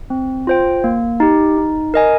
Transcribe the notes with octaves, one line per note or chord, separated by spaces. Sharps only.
C4
F4 C5 G5
A#3
D#4 G4
D#4
A#4 D#5 G#5